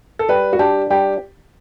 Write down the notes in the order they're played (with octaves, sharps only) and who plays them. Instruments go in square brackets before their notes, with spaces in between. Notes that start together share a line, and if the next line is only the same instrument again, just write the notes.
[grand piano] A4
[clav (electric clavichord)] G3 [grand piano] B4
[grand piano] F#4
[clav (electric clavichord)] D4 [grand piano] G4
[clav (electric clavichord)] G3 [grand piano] G4